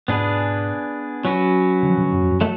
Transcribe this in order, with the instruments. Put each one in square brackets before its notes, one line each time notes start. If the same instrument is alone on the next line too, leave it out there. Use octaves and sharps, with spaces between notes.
[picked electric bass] G#2 B2 [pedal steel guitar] B3 D4 G#4 B4
[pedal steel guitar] F#3 C#4 F#4 B4
[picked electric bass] D3
F3
B2 D3
F#2
F2
F#2
[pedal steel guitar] F#3 A3